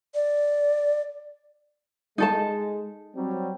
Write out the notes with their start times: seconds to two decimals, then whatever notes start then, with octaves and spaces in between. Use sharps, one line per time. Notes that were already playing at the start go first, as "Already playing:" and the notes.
0.14 D5
2.18 G#3 D#4 A4 A5
3.15 F#3 G3 C4